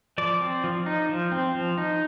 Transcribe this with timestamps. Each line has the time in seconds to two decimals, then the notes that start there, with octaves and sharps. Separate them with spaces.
0.18 F3 D5 D6
0.41 C4
0.64 F3
0.86 D#4
1.09 F3
1.32 C4
1.55 F3
1.78 D#4